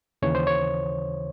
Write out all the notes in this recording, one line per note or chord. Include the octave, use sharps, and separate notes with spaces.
D#2 C#3 E3 C#5
C5
C#5